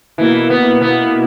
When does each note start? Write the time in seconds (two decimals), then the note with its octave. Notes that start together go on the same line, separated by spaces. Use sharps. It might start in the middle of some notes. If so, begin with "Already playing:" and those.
0.18 B2 E3 A#3 E4
0.50 B3
0.81 B3